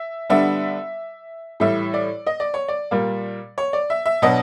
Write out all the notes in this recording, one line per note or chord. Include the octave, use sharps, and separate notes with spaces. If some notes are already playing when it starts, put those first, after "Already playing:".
Already playing: E5
D3 G3 B3 D4 E5
A2 E3 G3 E5
D5
D#5
D5
C#5
D5
A#2 G3 A#3
C#5
D5
E5
E5
B2 F#3 B3 D4 D#5